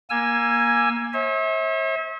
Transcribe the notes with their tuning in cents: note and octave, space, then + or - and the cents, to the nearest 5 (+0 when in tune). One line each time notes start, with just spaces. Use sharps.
A#3 +20 G#5 +0 E6 +30
C#5 -45 E5 -35